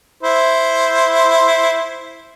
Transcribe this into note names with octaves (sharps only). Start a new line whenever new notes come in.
E4 C5